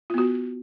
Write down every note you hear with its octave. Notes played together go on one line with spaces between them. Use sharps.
B3 F4 F#4